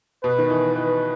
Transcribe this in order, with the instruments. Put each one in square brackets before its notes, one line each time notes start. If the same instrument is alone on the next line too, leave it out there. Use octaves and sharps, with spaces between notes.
[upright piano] B2 [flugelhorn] B4
[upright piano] D#3
E3
[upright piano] E3 [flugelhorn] B4